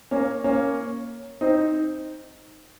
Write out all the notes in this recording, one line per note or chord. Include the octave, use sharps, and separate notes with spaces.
A#3 C#4
A#3 C#4
C4 D#4